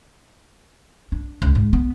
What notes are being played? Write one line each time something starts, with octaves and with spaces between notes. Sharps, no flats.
D4
C#2
G#2
B3